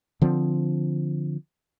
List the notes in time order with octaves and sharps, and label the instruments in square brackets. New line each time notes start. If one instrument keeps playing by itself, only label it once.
[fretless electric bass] D3 F3 C4